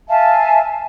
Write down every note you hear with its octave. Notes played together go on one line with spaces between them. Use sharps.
E5 F5 G#5 A5